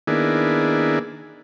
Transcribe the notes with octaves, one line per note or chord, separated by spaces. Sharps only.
D#3 A#3 B3 D4 E4 G#4